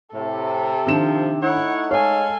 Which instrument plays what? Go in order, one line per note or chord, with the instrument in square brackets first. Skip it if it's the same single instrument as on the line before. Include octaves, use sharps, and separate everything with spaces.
[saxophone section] A2 [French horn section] C3 [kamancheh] A4
[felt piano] D#3 D4 E7 [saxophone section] F3
[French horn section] A3 D#4 [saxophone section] E4 C#5 [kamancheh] F#5
[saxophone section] G#3 F5 [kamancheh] A4 G#5 [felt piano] C#5